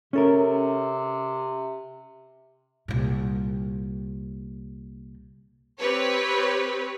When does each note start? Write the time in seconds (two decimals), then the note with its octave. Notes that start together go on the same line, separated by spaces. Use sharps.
0.13 C3 C#4 A4 A#4
2.88 C2 A#2
5.81 C4 G4 B4 C#5